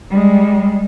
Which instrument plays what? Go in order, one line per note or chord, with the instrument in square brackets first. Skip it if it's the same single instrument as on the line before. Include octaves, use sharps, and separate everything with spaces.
[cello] G3 G#3